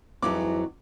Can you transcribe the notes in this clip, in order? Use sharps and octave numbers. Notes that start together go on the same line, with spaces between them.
F2 G#2 E3 F#3 C4 E4 D6